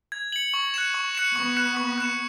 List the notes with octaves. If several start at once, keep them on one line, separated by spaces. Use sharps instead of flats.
G#6
C#7 F#7
C#6
F#6 C#7 E7
C#6
F#6 C#7 E7
B3 C#6
F#6 C#7 E7
C#6
F#6 C#7 E7